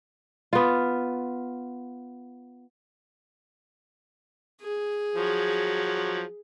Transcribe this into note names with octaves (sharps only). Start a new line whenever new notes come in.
B3 F4
G#4
F3 F#3